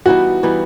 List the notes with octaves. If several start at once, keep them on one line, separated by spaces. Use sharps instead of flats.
E3 G3 B3 D#4 F#4
E3 G3 B3 D#4